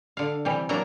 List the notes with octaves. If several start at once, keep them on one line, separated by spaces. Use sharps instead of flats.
D3 F5
C3 E3 G3
F#3 A#3 D4 A#5